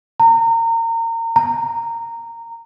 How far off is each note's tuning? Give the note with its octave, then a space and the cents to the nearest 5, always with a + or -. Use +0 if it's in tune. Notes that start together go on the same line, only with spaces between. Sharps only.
A#5 -30
A#5 -15